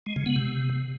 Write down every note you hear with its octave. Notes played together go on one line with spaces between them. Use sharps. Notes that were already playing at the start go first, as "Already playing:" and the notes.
G#3
C#3
B3
C3